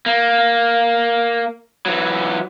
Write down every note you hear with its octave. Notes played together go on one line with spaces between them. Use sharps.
A#3
E3 F#3